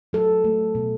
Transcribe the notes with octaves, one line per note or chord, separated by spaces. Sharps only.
F#3 A4
A3
B2